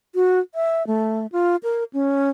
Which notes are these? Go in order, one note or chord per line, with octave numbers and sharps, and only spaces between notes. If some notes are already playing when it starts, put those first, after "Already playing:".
F#4
E5
A3
F4
A#4
C#4